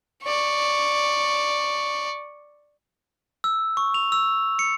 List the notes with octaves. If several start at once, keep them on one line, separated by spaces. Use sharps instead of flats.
D5 C#6
E6
C#6
F7
E6
C#7